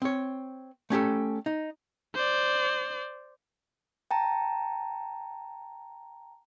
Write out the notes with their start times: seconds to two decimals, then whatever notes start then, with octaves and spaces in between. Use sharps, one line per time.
0.02 C4 C#5
0.90 A3 C#4 G4 A4
1.46 D#4
2.15 C5 D5
4.11 G5 A5 A#5